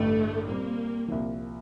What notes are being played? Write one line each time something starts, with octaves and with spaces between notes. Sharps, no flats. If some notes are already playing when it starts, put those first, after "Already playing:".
Already playing: A1 G2 D3 A3
A#2 G3 A#3 C4
C2 A#2 F3